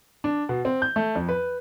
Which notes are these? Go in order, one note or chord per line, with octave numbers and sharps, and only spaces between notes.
D4
B2
C4
G6
A3
F2
B4